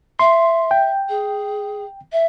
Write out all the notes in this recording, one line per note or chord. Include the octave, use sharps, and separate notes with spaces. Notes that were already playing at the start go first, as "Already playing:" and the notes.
E5 C6
G5
G#4
E5